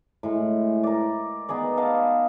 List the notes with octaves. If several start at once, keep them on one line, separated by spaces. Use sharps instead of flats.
A2 G#3
A#4 D5
B3 D#4 G#4 D5
D#5 F5 A5